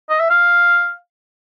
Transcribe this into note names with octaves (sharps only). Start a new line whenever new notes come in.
D#5
E5
F5